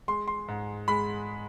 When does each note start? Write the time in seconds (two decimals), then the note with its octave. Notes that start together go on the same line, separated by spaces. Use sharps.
0.08 G#3 C6
0.27 C6
0.48 G#2
0.88 G#3 B5